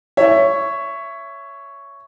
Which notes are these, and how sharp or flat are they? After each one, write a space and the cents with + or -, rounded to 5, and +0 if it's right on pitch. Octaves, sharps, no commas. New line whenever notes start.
C#5 +5 E5 +15